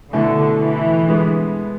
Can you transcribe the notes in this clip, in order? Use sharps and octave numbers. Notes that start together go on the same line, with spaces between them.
B2 D3 A3 E4
E3
D3 G#3 B3